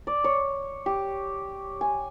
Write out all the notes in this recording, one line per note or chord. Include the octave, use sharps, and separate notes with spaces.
D5
C#5
G4
G#5